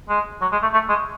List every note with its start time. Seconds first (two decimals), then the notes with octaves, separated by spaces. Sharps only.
0.09 G#3
0.42 F#3
0.52 G#3
0.62 A3
0.74 A3
0.89 G#3